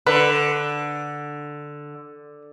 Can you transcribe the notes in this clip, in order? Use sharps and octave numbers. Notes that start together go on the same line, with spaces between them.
D3 B4